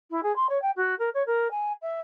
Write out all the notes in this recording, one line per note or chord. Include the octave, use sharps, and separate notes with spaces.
E4
G#4
C6
C#5
G5
F#4
A#4
C#5
A#4
G#5
E5